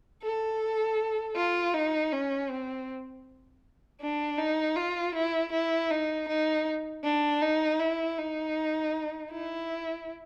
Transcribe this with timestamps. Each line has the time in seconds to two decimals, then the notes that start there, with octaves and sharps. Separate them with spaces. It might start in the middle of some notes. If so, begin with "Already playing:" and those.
0.22 A4
1.36 F4
1.74 D#4
2.12 C#4
2.50 C4
4.01 D4
4.38 D#4
4.76 F4
5.15 E4
5.52 E4
5.90 D#4
6.28 D#4
7.04 D4
7.41 D#4
7.80 E4
8.17 D#4
9.31 E4